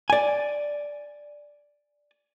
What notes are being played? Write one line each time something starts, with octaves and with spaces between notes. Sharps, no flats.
D5 G#5